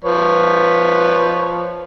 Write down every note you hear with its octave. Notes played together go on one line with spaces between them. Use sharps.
F3 B4 C#5